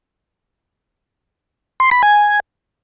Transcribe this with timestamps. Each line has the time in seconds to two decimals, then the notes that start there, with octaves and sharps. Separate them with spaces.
1.80 C6
1.91 B5
2.03 G#5